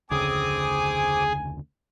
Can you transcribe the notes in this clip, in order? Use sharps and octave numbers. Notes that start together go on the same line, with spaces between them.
F1 D2 C#3 C4 G#4 G#5 D6 D#6